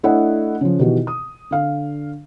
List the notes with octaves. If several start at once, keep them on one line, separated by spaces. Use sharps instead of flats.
A3 D4 E4 C#5 D#5 F#5
C#3 F3
B2 D#3 E3 F#4 G4
D#6
D3 F5